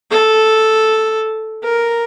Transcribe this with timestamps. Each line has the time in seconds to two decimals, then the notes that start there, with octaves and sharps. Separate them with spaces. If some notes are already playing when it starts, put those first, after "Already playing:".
0.11 A4
1.63 A#4